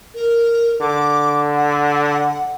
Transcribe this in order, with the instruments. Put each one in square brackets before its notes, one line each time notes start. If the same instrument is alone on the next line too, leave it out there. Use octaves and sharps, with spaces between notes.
[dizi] A#4
[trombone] D3 [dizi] D6
[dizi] F#5